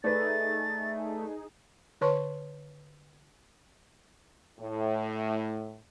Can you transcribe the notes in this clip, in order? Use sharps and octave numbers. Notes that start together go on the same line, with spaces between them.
A3 D#4 G#4 B4 D5 A6
D3 B4 C#5 A5 C6 C#6
A2